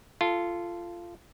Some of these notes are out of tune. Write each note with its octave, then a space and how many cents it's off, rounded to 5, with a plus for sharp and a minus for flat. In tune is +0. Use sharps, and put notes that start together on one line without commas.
F4 -15 A4 +0